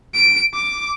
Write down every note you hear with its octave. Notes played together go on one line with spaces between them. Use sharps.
D7
D6